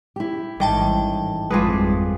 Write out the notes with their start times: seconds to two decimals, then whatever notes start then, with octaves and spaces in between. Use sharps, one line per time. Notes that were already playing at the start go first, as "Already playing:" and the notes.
0.16 E4 G4
0.60 A1 G#2 D#3 G3 G5 A5
1.51 G#1 F2 F3 G3 G#3 G#4 B4